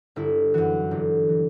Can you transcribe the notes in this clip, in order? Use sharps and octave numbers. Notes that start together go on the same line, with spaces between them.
G1 E4
F#2 E3 F#4
G1
E3